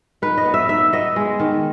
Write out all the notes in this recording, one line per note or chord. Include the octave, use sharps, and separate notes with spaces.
D#4 B4
D#5
B3
E5
D#4 E5
B3 D#5
G#3
D#3